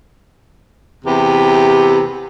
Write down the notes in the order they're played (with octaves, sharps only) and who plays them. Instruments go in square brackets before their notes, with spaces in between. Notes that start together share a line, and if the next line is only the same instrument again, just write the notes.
[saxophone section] E2 C3 G4 B4